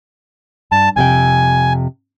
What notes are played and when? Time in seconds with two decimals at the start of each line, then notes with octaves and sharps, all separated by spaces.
0.72 G2 A5
0.96 F2 C3 G5 G#5